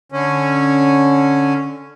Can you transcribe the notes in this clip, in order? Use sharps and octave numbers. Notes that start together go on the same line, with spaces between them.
D3 C#4